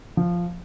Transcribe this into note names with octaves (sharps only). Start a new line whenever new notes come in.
F3